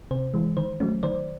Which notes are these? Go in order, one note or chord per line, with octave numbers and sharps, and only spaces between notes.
C3 C5
E3 G#3
D#3 C5
F#3 A3 C#4
D#3 C5 D5